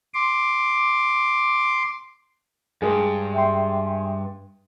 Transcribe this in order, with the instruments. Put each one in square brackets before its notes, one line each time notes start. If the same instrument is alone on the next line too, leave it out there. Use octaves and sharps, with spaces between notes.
[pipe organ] C6 D6
[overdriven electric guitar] G2 [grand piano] G#3 G#4
[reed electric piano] E5 G5 C6